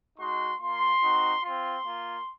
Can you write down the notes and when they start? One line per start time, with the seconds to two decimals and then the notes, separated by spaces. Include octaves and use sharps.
0.18 G#3 D#4 F#4 C6
0.60 A#3 F4 C6
1.01 C4 D#4 F#4
1.43 C4 F4 C6
1.85 A#3 F4